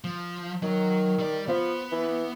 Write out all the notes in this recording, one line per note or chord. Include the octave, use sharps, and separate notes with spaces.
F3
D#3 F#3
G3 D5
F3 B3
E3